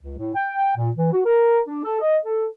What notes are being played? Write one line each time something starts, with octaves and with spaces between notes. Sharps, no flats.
C#2
A2
G5
A#2
E3
F#4
A#4
D4
A4
D#5
A4